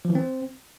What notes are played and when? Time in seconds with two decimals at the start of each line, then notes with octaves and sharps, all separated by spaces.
0.05 F3
0.10 E3
0.15 C4